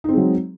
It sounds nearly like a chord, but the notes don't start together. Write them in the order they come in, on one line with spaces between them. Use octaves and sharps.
D#4 C4 G#3 F#3